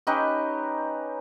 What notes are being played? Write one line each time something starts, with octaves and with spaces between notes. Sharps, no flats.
C#4 D#4 G4 B4